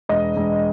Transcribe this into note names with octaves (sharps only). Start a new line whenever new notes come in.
E1 D#5
E1